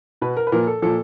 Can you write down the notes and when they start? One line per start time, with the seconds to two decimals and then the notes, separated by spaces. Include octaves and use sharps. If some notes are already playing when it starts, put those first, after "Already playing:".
0.21 B2 B4
0.37 A#4
0.47 B4
0.52 A#2 F3 A#4
0.67 A4
0.82 A#2 F3 A4